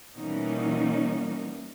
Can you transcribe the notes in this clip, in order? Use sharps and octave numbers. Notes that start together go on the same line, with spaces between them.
B2 E3 G3 A#3 C#4 D#4